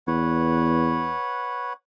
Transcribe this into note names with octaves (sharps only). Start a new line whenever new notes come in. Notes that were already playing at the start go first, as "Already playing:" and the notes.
E2 B4 C#5 F#5